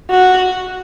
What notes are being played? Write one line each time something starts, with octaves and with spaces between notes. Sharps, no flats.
F#4